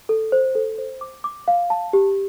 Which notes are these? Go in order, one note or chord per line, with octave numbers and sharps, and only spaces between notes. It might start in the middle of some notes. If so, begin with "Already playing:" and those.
A4
C5
A4
C5
D6
D6
F5
A5
G4